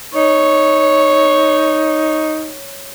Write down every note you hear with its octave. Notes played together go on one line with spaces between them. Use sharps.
D#4 C#5